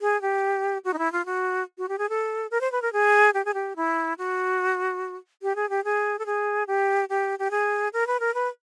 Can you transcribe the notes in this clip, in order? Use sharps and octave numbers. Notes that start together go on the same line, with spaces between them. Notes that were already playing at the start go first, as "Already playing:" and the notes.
G#4
G4
F#4
D#4
E4
F4
F#4
F#4
G4
G#4
A4
A#4
C5
B4
A#4
G#4
G4
G#4
G4
E4
F#4
G4
G#4
G4
G#4
A4
G#4
G4
G4
G4
G#4
A#4
B4
A#4
B4